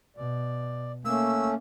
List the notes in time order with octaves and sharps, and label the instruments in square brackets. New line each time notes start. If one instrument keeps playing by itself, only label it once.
[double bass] B2 [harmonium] D5
[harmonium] A3 C#4 [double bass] A#3 [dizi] E6